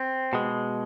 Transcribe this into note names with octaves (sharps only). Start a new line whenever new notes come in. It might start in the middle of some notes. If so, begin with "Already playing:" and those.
Already playing: C4
B2 G#3